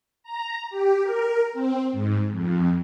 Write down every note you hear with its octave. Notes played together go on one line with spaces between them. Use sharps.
A#5
G4
A#4
C4
G#2
F2